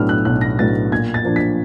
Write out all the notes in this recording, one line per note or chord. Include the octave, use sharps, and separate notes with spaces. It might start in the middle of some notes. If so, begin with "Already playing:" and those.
Already playing: B1 A2 F#3 B3 D4 E6 F6
F#6
B1 F#6
A#6
A2 F#3 B3 D4 A6
A#2 G#6
A6
F3 A#3 D4
B6